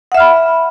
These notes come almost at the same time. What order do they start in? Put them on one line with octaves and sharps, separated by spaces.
F#5 E5 F6 B5